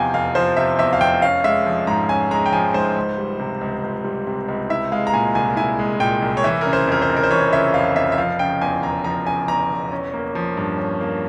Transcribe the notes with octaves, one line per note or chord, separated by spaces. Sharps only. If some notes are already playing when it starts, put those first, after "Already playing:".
Already playing: E2 C3 F3 F5 G5 G#5
F1 F5
F3 C5
C3 E5
E2 E5
F5
F1 G5
C#4 F5
G#3 E5
F3
G#2 A#5
C#4 G#5
G#3 A#5
G5
F3 G#5
G#2 C5
C#2
G3
C3
C#2
C#2
G3
C3
C#2
E4 E5
G#3 F5
A#5
A#2 G#5
C2 G#5
E4 G#5
G#3
A#2 G5
C2
C#5
E3 E5
C#3 A#4
C5
F2 A#4
C5
F1
A#4
C5
E3 C#5
C#3 E5
F2 F5
F1 E5
E5
F3 F5
C#3 G5
E2 G#5
E1 A#5
F3 A#5
C#3 G#5
E2 A#5
E1
C#4
A#3
F3
G2
C#4
A#3